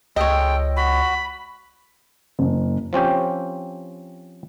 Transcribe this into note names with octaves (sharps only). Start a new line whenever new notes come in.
C#2 G#3 A4 C#5 D#5 G5
F#4 B5
F#1
F3 C4 C#4 G4